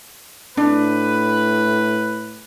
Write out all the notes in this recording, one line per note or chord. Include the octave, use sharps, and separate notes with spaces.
A2 D4 B4